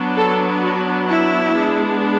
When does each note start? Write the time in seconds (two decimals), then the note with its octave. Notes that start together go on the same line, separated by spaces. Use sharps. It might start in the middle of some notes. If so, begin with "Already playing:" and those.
Already playing: F#3 B3 D4
0.17 A4
0.63 F#4
1.08 E4
1.53 G#3 B3 D4